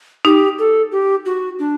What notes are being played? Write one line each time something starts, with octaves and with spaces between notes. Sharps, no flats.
D#4 G4
A4
G4
F#4
D4